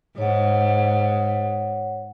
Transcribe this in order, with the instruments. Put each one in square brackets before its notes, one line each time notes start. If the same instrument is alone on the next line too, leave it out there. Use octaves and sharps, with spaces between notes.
[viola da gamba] G#2 [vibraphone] C#5 F#5